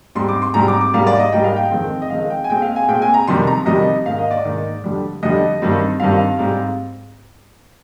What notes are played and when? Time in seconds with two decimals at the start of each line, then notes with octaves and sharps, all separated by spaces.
0.15 G#2 G3 C4 C6
0.29 D6
0.42 C6
0.54 G#2 G3 C4 A#5
0.68 D6
0.81 D6
0.93 G#2 G3 A#3 F5
1.07 D5
1.19 D#5
1.32 G#2 G3 A#3 G5
1.44 F5
1.56 G5
1.71 F2 D#3 G#3 C4
2.02 D#5
2.10 F2 D#3 G#3 C4 F5
2.30 G5
2.44 G#5
2.49 A#2 G#3 C4 G5
2.62 F5
2.76 G#5
2.88 A#2 G#3 C4 G5
3.02 G#5
3.14 A#5
3.27 F2 C3 D#3 G3 C6
3.47 A#5
3.66 F2 C3 D#3 G3 D#5
4.05 G#2 D#3 A#3 F5
4.19 D#5
4.31 D5
4.45 G#2 D#3 A#3
4.84 F2 D3 G3
5.23 F2 D3 G3 D#5
5.62 G2 D#3 G3 C4
6.00 G2 D#3 G3 C4 F5
6.39 G#2 G3 C4